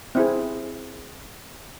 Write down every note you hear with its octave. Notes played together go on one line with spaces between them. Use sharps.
C4 E4 G#4